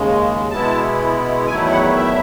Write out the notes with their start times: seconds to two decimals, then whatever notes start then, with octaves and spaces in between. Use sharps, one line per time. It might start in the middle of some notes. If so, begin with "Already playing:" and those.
Already playing: D#2 C#3 G#3
0.51 B2 G#3 B3 E4 A5
1.47 E2 D#3 F#3 A3 E4 G#5
1.71 F#5
1.95 E5